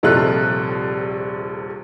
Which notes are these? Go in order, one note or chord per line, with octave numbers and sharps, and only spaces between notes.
D#1 A#1 C3 F4 A4 F#6